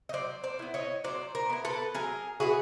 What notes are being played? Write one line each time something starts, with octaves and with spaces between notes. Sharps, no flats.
D#5
F#3 C5 D5
C5 D5
B3 E4
C#5 D#5
F#3 C5 D5
A#4 C5
B3 E4
A4 B4
F#3 G#4 A#4
B3 E4 F#4 G#4